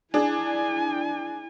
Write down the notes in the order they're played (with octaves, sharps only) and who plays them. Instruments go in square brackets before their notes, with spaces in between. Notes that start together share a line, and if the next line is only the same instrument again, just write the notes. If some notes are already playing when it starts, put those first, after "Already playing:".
[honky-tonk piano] D4 G#4 [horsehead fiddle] E4 G#5